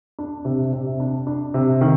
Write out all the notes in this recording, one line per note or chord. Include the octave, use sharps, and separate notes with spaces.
D4
C3
C3
D4
D4
C3
D#3